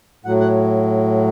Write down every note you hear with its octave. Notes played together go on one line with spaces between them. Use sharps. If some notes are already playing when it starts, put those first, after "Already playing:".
A2 F#3 F#5
F#5